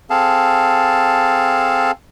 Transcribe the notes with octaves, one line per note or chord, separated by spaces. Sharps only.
C4 G#4 A4 F5 A5